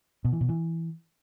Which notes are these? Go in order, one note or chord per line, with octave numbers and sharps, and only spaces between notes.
B2
E3
B2
E3